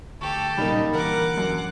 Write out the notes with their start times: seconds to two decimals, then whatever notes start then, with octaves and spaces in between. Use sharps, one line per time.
0.21 D2 G4 A4 C#6
0.57 A#2 C#3 F#3 G3 A#3 D#4
0.93 D3 E3 A#4 F#5 D6
1.37 F#2